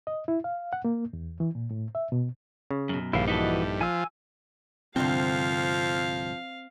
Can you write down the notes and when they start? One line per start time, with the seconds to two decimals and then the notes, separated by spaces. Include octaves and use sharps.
0.07 D#5
0.28 E4
0.44 F5
0.73 F#5
0.85 A#3
1.13 E2
1.40 E3
1.55 A#2
1.71 A2
1.95 E5
2.12 B2
2.71 C#3
2.89 F#2 B2
3.13 A#1 G2 D3 D#3 E4 F5
3.28 E3 D#4 E4 F#4 A4 D#5
3.81 F3 G#5 E6
4.96 C2 G2 D3 F3 C4 F5